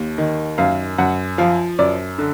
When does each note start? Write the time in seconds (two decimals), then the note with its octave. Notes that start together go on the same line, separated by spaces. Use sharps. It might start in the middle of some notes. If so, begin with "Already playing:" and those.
Already playing: D#2
0.18 D#3
0.58 F#2 F5
0.98 F#2 F#5
1.38 F3 F5
1.79 F#2 D5
2.18 D3